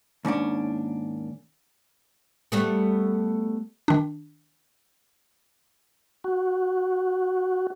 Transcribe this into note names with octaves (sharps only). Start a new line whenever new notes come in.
D#2 G#2 C#4 D4
G3 A3 B3
D#3 D4
F#4